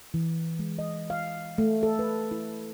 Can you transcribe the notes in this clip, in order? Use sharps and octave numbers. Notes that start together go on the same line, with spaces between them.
E3
G#3
D#5
F5
A3
A4
B4
E4